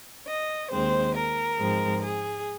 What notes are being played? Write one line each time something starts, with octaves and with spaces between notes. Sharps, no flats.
D#5
D#2 D#3 G#3 C4 C5
A#4
G#2 F3 G#3 C4
G#4